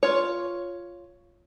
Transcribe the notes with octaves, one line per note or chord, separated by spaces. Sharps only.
F4 C#5